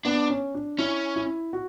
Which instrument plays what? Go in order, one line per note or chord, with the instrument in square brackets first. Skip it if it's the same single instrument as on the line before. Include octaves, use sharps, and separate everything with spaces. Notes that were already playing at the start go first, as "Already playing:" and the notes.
[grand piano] B3 [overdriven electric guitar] D4
[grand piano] C#4
D4
[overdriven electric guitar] C#4 [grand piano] E4
[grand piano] E4
F#4